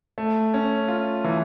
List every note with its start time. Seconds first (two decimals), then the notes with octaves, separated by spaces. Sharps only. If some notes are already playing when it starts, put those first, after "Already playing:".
0.18 A3
0.54 C#4
0.88 F4
1.24 E3